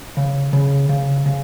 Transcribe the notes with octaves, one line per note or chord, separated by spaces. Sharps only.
C#3
C#3
C#3
C#3